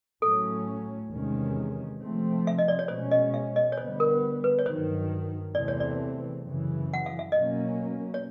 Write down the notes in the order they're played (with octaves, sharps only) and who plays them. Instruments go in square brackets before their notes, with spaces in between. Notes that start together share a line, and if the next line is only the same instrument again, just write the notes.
[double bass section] A2 F#3 A3 C#4 [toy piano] A4
[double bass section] E2 C3 D#3 G#3 C#4
C3 F3 A3 C4
[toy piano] E5
D#5
D5
C#5
[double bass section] B2 G#3 C#4 [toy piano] C5
[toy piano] D#5
E5
D#5
C#5
[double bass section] D3 G3 B3 [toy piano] C5
[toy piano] A#4
B4
C#5
[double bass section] G2 D#3 F#3 [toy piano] C5
[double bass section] E2 C3 E3 A3 C4 [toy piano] D5
[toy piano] C#5
D5
[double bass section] F#2 C#3 E3
[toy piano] F#5
F5
E5
[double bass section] B2 F#3 A#3 C#4 [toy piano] D#5
[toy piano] C#5